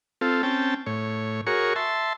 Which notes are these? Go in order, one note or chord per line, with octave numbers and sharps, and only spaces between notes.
C4 F4 A4
C4 C#4 G5 A5
A2 C#5
F#4 G#4 A#4 C#5 C#6
E5 A5 C6